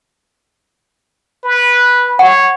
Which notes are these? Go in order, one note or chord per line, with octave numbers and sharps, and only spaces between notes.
B4
C#5 F#5